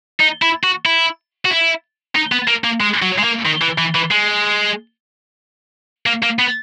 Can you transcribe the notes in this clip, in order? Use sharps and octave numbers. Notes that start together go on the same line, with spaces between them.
D#4
E4
F#4
E4
F#4
E4
D#4
B3
A#3
A#3
G#3
F#3
G#3
A#3
D#3
E3
E3
E3
G#3
A#3
A#3
B3